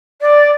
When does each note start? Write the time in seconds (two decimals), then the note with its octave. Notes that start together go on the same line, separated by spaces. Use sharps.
0.21 D5